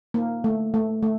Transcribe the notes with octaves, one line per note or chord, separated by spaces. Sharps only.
A#3
A3
A3
A3